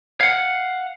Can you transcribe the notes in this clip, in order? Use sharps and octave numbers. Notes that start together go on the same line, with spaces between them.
F5 F#5